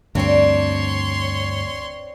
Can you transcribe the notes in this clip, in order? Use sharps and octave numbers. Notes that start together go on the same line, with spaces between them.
D2 G2 C4 D4 C#5 C6